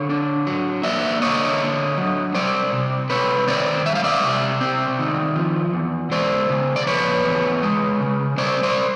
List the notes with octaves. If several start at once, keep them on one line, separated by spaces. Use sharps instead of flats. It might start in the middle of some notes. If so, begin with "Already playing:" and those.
Already playing: D3 C#5
D4
F#3
A#3 D5 E5
D3 C#5 D#5
D4
F#3
G3 C5 D5
C3
C4 B4 C#5
D#3 C5 D5
G3 E5
F5
D5 E5
C3
C4
D#3
F3
E2
G#3 C5 D5
C#3
D5
F3 B4 C#5
E2
G#3
C#3
G3 C5 D5
C5 D5